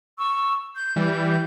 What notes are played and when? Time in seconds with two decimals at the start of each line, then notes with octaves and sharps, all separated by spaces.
0.17 C#6 E6
0.74 G6
0.96 E3 G3